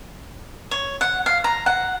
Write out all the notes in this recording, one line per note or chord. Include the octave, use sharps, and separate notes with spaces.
C#5
F#5
F5
A#5
F#5